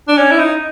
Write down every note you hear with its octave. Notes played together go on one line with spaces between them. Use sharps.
D4
C#4
E4
D#4